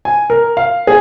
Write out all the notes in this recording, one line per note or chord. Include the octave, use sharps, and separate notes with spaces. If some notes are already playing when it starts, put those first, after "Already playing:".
G#5
A#4
F5
G#4